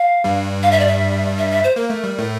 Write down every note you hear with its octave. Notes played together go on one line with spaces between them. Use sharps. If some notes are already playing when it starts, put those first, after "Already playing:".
Already playing: F5
G2 G3
F5
E5
D5
E5
E5
E5
C5
A#3 A#4
A3
G3
A2 A3